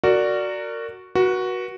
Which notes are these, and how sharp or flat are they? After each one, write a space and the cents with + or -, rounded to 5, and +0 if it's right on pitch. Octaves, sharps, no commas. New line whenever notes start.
F#4 +0 A#4 -20 D5 +0
F#4 +0 B4 -45